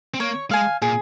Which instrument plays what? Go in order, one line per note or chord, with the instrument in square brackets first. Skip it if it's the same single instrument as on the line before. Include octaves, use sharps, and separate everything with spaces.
[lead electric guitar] C4
[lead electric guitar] A#3 [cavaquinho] C#5
[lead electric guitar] G#3 [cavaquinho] F5 G#5
[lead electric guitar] A#2 [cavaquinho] G#4